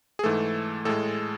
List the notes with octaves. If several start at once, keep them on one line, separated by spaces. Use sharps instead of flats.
G#4
G#2 E3 A3 A4
A2 G#3 A4